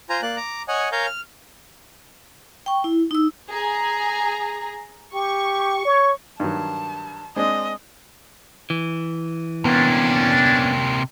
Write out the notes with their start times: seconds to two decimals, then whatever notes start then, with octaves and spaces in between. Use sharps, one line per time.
0.10 F4 C5 G#5 A#5
0.22 A#3 D5 F#6
0.37 A#5 D6
0.68 C#5 D#5 F#5 G#5
0.92 A#4 C#5 F5 G#5 A#5 G6
1.06 F6
2.66 G5 C#6
2.84 E4
3.11 D#4 E6
3.51 G#4 A#5
5.14 G4 C#6
5.85 C#5
6.40 G2 D#3 F#3 A5
7.36 G#3 C4 D4 D#5
8.70 E3
9.65 C3 A#3 B3 C#4 D4